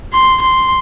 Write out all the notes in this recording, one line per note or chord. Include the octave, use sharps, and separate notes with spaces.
C6
C6